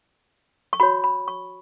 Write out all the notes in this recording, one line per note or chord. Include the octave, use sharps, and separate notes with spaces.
C#6
F#4 C#5 B5
B5
C#6